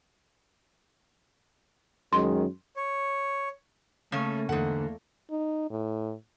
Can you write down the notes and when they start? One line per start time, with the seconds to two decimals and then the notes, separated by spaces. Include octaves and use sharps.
2.13 F#2 D#3 G#3 C6
2.76 C#5
4.12 C#3 A3 A#3 C#4
4.49 E2 G#2 D3 A3 A#3 F#5
5.30 D#4
5.70 A2